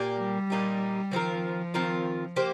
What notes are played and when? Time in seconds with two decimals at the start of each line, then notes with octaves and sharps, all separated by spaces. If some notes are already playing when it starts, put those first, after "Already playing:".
Already playing: A#2 A#3 G4
0.19 G3
0.50 A#2 A#3 D#4 G4
1.12 D#3 F3 C4 F4 A#4
1.74 D#3 C4 F4 A#4
2.36 A#3 G4 C5